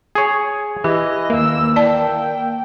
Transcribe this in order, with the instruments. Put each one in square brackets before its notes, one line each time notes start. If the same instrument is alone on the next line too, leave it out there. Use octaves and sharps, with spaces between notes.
[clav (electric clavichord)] G#4 C#5
[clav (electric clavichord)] E3 [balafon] G4 [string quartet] D#5
[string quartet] D#2 E6 [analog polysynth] A#3
[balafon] E4 D5 A5 [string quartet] G5